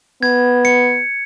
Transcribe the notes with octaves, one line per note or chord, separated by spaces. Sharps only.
B3 G#6
C#7